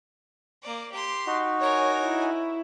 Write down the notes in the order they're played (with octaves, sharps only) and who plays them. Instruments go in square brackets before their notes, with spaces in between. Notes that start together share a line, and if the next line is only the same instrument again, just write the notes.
[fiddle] A#3 D5
G4 C6
[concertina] D#4 F#4
[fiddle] A#4 G#5 [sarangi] C#5
[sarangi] E4